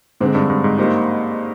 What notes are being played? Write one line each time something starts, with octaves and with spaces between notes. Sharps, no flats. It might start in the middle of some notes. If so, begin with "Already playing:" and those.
G#2 D3 G#3 C4
G2
G2
G#2
A#3 D#4 G4 C5